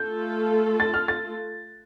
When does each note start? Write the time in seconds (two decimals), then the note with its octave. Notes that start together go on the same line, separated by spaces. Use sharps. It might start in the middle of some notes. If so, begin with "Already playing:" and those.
Already playing: A3 F4 A4 G6
0.80 A6
0.94 F6
1.08 A6